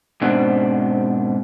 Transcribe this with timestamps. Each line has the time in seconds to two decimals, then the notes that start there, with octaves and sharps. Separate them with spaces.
0.21 G#2 B2 C4 D4